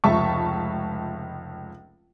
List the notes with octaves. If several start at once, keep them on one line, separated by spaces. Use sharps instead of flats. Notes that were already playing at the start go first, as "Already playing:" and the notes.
F1 C#2 E5 A5 C#6